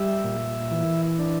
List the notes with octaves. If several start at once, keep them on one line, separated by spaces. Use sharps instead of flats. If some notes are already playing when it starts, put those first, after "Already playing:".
Already playing: G3 E5
A#2
E3
D4